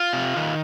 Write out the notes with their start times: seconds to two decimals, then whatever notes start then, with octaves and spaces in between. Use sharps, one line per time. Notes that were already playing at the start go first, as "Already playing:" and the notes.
Already playing: F4
0.13 C3
0.36 D#3